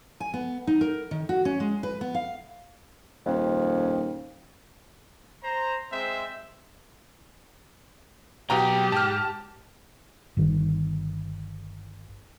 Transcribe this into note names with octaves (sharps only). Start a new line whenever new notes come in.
G#5
B3
D#4
A#4
D#3
F#4
C#4
G#3
B4
B3
F5
D#1 F2
C5 A#5
G#3 C4 C5 E5
B2 F#3 G4 G5 A#5
G#2 A5 F6
G1 D#3